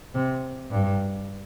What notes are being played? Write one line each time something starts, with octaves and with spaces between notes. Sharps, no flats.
C3
G2